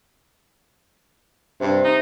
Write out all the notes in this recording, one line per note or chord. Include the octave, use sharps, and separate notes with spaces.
G2 C3
D#4